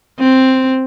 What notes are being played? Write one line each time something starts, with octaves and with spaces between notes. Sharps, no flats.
C4